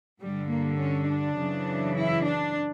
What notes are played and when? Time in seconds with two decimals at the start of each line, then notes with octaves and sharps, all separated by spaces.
0.21 G2 D3 G3
0.50 A#3
0.80 C#4
1.09 D4
1.39 F#2 C#3 E3
1.97 E4
2.26 D4